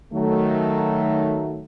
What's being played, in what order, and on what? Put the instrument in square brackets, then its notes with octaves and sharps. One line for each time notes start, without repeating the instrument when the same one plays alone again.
[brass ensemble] D#3 F#3 A3